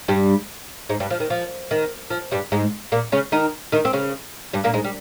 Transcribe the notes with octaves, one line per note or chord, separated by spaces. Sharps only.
G2 G3
G#2 G#3
G2 G3
F3
D#3
F3
D#3
F3
G2 G3
G#2 G#3
A#2 A#3
C#3 C#4
D#3 D#4
D#3 D#4
C4
C#3 C#4
G2 G3
A#2 A#3
G#2 G#3
G3